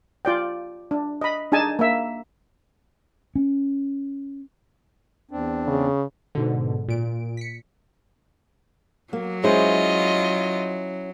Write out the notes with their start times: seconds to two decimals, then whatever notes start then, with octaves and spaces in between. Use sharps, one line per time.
0.25 F4 D5 G5
0.91 D4
1.21 D#5 B5
1.52 D4 D#4 G#4 G#5 A5
1.79 A#3 E5
3.35 C#4
5.31 E2 C4 D4
5.67 C#3
6.35 G#2 B2 D3
6.88 A#2 D7
7.37 B6 C#7
9.13 F#3 A#3
9.44 G#3 C#4 E4 F4 C5 D#5